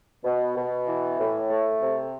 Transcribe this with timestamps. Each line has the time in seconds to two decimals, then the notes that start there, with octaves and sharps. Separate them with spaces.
0.24 B2
0.56 B2
0.87 E3
1.18 A2
1.50 A3
1.81 C3